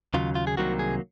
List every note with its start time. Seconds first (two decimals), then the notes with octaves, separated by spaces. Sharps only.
0.14 D#2 C#3 F#3 F4
0.35 F4
0.47 G#4
0.57 C2 C3 D#3 F#3 A#3 F#4
0.79 G#4